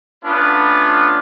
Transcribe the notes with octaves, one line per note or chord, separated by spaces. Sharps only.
A3 B3 C#4 D4 F4 B4